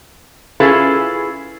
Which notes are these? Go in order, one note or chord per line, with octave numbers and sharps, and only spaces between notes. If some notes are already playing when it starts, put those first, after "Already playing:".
C#4 E4 F4 G#4 A4 B4